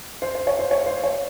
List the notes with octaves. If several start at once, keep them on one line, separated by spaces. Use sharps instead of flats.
C5
C5
C#5
C5
C#5
C5
C#5